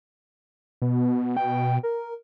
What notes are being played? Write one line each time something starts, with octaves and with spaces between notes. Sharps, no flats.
B2 B3
G5
A#4